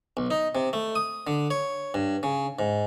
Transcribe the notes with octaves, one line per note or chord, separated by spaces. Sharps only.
B1
D#4
C3
A3
D#6
D3
C#5
G2
C#3
G#2